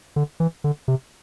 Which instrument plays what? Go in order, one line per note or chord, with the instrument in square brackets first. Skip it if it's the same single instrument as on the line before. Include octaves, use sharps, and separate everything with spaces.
[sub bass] D3
E3
D3
C3